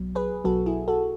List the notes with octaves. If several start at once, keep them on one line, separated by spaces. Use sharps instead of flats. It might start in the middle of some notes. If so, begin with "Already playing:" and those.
Already playing: B1 B2 F#3
G#4 B4
B1 B2 F#3 F#4 A4
E4 G#4
F#4 A4